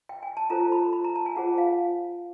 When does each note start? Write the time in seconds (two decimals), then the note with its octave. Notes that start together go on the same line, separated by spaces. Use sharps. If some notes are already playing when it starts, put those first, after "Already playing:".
0.09 G5
0.23 G#5
0.37 A5
0.50 F4 A4 C5 A#5
0.72 B5
0.93 B5
1.04 A#5
1.15 A5
1.26 G#5
1.36 F4 G#4 C5 F#5
1.58 F5